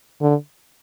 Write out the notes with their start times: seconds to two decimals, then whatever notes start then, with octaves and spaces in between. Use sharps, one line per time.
0.21 D3